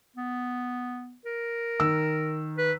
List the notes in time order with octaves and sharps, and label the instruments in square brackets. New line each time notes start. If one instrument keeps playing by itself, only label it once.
[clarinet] B3
A#4
[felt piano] D#3 E6
[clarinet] B4